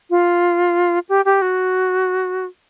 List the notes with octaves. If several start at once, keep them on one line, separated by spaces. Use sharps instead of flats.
F4
G4
G4
F#4